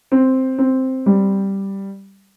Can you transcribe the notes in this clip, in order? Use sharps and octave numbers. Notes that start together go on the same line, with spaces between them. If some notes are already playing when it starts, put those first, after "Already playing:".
C4
C4
G3